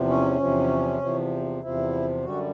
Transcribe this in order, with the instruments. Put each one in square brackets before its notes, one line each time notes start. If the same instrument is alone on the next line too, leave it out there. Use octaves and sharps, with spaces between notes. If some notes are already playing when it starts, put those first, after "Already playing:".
Already playing: [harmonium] E2 C3 F3
C#4
E2 C3 F3
E2 C3 F3
E2 C3 F3 E4
F#2 D3 G3 F#4